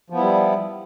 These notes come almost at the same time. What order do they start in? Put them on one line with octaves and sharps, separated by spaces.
F3 B3 E4 G3